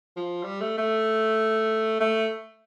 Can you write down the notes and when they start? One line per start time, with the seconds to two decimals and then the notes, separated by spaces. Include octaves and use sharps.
0.16 F3
0.44 G3
0.61 A3
0.78 A3
2.00 A3